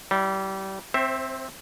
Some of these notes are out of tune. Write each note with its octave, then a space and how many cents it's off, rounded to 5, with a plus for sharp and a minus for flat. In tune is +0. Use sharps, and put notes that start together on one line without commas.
G3 -25 E4 +0
C4 +0 C5 +30 E5 +0